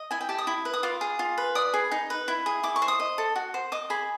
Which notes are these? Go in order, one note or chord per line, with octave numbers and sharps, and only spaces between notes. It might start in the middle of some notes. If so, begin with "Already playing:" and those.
Already playing: D#5
E4 G#5
G5
G4 A5
D#6
E4
B4
D#6
F4 D6
G#4
F4
B4
D5 D#6
G#4
D#4
B4
E4
G#4
E4 D6
C#6
C5
D#6
D#5
A4
F#4
C5
D#5 D6
G#4 B5